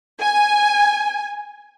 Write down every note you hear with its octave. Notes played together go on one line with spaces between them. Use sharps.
G#5